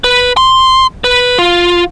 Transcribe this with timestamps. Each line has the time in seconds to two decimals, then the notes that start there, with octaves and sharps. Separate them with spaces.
0.04 B4
0.37 C6
1.04 B4
1.39 F4